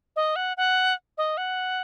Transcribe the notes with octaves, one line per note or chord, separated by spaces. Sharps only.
D#5
F#5
F#5
D#5
F#5